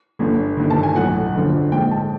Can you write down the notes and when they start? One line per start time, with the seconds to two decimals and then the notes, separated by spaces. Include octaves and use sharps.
0.19 G1 G2 D3
0.57 G1 G2 D#3
0.70 A5
0.83 G#5
0.95 B1 A2 F#3 A3 F#5
1.34 G1 F2 D3 F3
1.72 A#1 G#2 F3 G5
1.91 A5